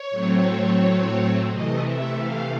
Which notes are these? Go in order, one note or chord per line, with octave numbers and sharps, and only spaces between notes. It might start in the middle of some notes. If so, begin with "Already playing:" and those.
Already playing: C#5
A2 F#3 A3 C4
C3 E3 A3 D#5
E5
F5